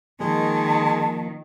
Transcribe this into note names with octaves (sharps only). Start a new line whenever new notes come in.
D#3 F3 G#3 A#3 A5